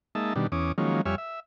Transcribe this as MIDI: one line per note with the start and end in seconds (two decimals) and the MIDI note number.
0.15 0.33 56
0.15 0.33 58
0.15 0.33 63
0.15 0.33 76
0.15 0.33 81
0.36 0.47 47
0.36 0.47 51
0.36 0.47 55
0.36 0.47 62
0.52 0.72 40
0.52 0.72 61
0.52 0.72 86
0.52 0.72 87
0.78 1.01 51
0.78 1.01 53
0.78 1.01 54
0.78 1.01 56
0.78 1.01 58
0.78 1.01 61
1.06 1.15 41
1.06 1.15 55
1.06 1.15 73
1.06 1.15 76
1.06 1.15 80
1.06 1.15 89
1.18 1.40 76